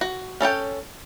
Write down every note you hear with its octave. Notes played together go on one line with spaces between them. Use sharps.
F#4
C#4 A4 C#5 G5